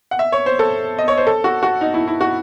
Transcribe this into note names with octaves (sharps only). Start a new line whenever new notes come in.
F#5
E5
C#5
C5
A4
D#5
C#5
C5
A4
F#4
F#4
D#4
E4
E4
F#4